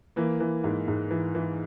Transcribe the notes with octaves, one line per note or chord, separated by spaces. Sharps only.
E3 A#3
E3
G#2
G#2
E3
E3